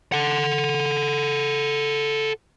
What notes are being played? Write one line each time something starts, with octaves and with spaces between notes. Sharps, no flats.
A4 F#5